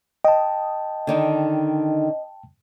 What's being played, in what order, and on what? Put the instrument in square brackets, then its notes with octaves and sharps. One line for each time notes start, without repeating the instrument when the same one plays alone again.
[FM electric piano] D#5 [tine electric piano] G5 A5
[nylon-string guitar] D3 D#3 D#4